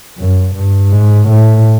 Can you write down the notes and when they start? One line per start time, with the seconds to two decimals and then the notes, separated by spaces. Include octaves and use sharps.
0.18 F#2
0.55 G2
0.92 G#2
1.29 A2